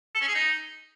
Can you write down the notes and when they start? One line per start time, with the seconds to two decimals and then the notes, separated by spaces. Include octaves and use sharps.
0.15 A4
0.21 C#4
0.28 G#4
0.35 D#4